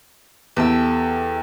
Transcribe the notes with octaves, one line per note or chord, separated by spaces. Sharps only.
E2 G4 A4 E5